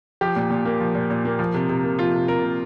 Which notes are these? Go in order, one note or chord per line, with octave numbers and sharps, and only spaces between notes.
F3 G4
A#2
A#2
A#3
F3
A#2
A#2
A#3
F3
C3
C3
A#3
F3 F4
C3
C3 A#4
A#3